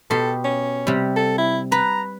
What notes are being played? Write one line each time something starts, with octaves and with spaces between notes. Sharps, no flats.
B2 G4 A4 C6
C#4
C3 G3
A4
E4
B4 A#5